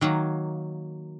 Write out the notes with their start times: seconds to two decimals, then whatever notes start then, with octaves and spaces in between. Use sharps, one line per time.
0.01 D#3 F#3 A#3